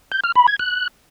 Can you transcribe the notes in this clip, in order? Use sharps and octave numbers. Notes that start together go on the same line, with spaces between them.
G6
F6
B5
G#6
F#6